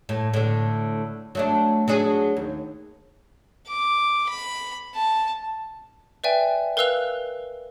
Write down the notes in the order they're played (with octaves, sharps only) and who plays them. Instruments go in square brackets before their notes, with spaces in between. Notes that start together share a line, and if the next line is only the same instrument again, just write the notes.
[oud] A2
A2 D3
F#3 A3 D4
F#3 D4 G#4
D#2
[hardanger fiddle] D6
B5
A5
[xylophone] B4 D5 E5 G5 G#5
A#4 B4 F5 E6 F#6 F7